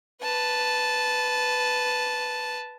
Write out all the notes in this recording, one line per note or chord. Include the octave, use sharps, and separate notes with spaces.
B4 A5